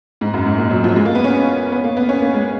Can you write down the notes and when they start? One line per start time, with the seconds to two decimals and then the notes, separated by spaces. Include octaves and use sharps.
0.21 G#2
0.34 F#2
0.46 G#2
0.58 A#2
0.71 F#3
0.84 F3
0.96 G#3
1.05 A#3
1.15 B3
1.24 C#4
1.72 B3
1.84 A#3
1.97 B3
2.09 C#4
2.22 A#3
2.34 G#3